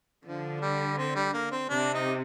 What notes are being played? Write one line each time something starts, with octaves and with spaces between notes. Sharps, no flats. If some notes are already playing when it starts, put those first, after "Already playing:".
D3 F3
G3
C4
G3
A#3
C4
C3 D4
D#4